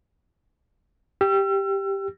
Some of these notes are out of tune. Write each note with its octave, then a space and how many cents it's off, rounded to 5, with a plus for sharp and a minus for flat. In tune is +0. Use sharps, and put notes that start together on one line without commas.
G4 +0 E6 +40